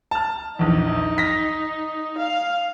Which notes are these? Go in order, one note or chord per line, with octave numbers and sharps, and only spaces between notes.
A5 F6
A#1 E2 D#4
A#6 B6
F5